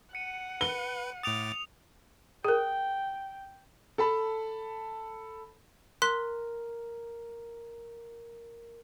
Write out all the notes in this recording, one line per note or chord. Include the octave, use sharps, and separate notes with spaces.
F#5 C#7 D#7
B4 G7
A2 D6 D#6 A6 F7
G#4 A#4 G5
A4 A5 B5
A#4 C6 F#6 B6